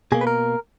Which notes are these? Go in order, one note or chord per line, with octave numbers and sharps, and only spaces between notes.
B2 A#3 G#4
B4
A#4